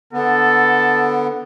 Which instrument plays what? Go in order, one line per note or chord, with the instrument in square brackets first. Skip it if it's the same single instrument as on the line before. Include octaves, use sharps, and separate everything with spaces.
[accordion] D3 B3 [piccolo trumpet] A4